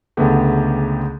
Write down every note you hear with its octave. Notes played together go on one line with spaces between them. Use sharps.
C#2 D3 G#3 A3 B3 G4